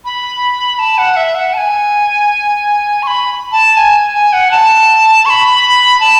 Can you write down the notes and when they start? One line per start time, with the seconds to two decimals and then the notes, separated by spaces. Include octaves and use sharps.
0.05 B5
0.79 A5
0.98 F#5
1.16 E5
1.35 F#5
1.54 A5
1.58 G#5
3.03 C#6
3.07 B5
3.52 A5
3.77 G#5
4.14 G#5
4.33 F#5
4.51 A5
5.26 C#6
5.30 B5
6.00 A5